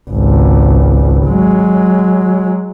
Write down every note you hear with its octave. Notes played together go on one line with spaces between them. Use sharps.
G#1 C#2
F#3 G#3